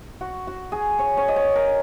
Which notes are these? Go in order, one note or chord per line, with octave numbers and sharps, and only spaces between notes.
F#4
F#4
G#4
C#5
C#5
D#5
C#5
A#4